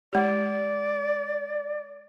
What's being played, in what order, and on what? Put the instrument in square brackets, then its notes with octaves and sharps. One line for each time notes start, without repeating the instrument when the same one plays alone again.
[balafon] G#3 G4 [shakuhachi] D5